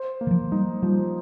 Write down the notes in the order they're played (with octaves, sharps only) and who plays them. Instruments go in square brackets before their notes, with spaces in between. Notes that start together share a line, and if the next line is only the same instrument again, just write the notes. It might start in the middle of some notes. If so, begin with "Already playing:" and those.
Already playing: [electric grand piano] C5
A#3
[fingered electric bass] D#3
F3
[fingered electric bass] G3 [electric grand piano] D#4
[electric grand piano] F3 [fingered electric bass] G3